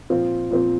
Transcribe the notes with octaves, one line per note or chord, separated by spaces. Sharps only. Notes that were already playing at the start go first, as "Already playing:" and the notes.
A#2 F3 C4 F4
A#2 F3 C4 F4